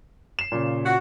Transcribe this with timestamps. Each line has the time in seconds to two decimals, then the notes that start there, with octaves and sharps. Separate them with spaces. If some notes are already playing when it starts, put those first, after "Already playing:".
0.39 C7 E7
0.52 A#2 C#3
0.86 F#4